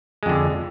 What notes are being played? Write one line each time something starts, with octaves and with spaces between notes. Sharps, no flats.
F2 D3 G#3